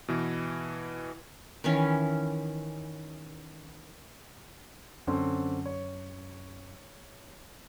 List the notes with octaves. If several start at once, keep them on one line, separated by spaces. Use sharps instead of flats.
B2 E3
D#3 E3 C#4
F#2 D3 C4 C#4
C#5